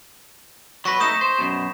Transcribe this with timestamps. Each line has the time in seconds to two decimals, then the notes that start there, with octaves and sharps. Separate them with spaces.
0.85 F#3 B4 C#6 A#6 B6
1.00 A3 D#4 D#6 G6 E7
1.21 C5
1.38 F#2 B2